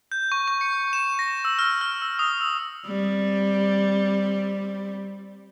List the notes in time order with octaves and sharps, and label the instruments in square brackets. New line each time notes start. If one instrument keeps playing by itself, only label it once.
[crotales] G6
C#6
C#6
C#7
E7
A#6
E6
F6
F6
E6
D#6
E6
[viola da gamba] G3 C4